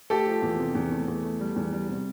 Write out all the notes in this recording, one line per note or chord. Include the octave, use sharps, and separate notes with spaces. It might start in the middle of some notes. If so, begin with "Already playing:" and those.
A3 G4 A4
F3
E2
C3
E2
A3
E2
A3
G3
E2
G3
C3